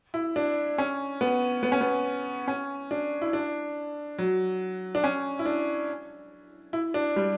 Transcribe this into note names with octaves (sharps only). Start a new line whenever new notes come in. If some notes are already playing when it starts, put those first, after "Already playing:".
E4
D4
C#4
B3
B3
C#4
B3
C#4
D4
E4
D4
F#3
D4
C#4
E4
D4
E4
D4
G3